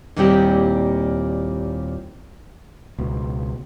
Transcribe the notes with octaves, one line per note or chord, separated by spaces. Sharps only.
D#2 A#2 G3 C4 E4 G4
C#2 B2